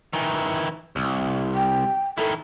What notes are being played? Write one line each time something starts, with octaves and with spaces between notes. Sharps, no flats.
D#3 E3
C2
G5
D#3 E4 A4